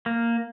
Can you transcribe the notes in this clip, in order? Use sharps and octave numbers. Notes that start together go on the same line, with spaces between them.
A#3